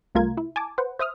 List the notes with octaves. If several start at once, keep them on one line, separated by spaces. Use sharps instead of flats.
C2 A3 F4 A#4 G#6
E4
G#5 A5 D6
B4 C5 F#5
C5 E5 D#6 F6